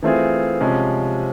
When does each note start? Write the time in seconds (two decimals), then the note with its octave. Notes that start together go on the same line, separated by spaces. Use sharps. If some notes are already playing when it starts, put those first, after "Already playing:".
0.02 E3 A3 C4 F4 G#4
0.61 C3 F3 G#3 C#4